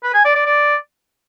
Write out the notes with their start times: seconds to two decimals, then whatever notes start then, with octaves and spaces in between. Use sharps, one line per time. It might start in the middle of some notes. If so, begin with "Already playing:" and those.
0.03 B4
0.14 G#5
0.25 D5
0.35 D5
0.46 D5